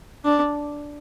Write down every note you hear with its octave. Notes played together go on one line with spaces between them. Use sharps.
D4